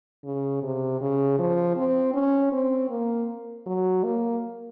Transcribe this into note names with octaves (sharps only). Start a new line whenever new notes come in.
C#3
C3
C#3
F3
C4
C#4
C4
A#3
F#3
A#3